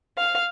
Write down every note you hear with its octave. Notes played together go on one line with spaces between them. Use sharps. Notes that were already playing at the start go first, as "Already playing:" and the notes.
F5